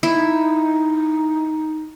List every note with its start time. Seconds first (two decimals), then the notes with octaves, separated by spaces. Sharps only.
0.03 D#4 E4